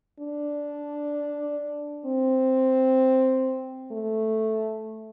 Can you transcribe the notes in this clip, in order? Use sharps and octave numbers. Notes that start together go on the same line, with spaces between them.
D4
C4
A3